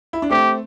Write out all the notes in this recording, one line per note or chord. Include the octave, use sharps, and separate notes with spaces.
E4
D4
A3 C4 G4